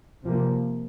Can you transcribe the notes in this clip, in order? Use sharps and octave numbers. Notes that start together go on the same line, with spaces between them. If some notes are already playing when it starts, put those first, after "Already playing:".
C3 F3 A#3